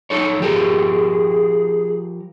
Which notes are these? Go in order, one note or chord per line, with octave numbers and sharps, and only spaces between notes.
D#4 A4 C#5
F3 G4 G#4 A#4